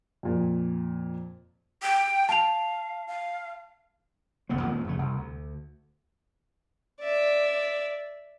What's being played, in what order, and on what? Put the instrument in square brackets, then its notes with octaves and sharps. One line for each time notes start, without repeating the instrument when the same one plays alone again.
[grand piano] F2 A#2
[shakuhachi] G5
[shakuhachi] F5 [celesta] A5 F7
[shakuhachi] F5
[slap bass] F#1 D#2 B3 C4
D#2 A#2 D#3 G#3
F2 C#3 A3
C2
D2
[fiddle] D5 E5